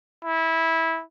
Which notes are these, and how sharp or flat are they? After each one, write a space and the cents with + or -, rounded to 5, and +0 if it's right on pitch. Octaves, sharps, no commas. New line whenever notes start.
E4 -15